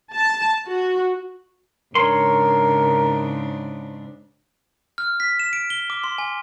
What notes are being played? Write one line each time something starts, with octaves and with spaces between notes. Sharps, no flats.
A5
F#4
G#2 C#3 D4 A#4 C#5 C6
F6
B6
E7
D7
G7
D6
C6
G#5